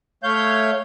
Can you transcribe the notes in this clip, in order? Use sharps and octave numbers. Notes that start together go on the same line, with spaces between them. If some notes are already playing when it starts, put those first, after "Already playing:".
A3 C#5 F5 G6